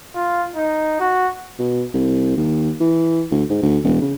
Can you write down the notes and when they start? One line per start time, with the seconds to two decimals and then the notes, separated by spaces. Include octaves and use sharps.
0.15 F4
0.56 D#4
1.00 F#4
1.59 B2
1.94 C2
2.37 D#2
2.81 E3
3.31 D2
3.50 G#2
3.62 D2
3.84 E1
4.01 C#3